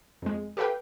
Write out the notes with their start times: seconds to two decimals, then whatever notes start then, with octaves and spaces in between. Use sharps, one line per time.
0.22 F2 G#3
0.57 G4 A4 B4 F5 G5